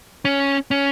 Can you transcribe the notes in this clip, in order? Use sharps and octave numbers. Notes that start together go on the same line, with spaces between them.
C#4
C#4